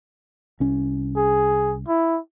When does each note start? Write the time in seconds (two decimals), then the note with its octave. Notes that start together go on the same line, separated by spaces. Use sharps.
0.60 C2 C#4
1.17 G#4
1.88 E4